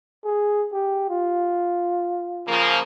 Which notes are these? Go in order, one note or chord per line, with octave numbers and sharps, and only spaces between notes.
G#4
G4
F4
C#3 F3 A#3